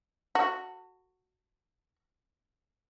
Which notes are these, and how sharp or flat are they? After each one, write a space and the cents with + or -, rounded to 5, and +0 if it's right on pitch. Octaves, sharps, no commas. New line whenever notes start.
F#4 +0 A4 +35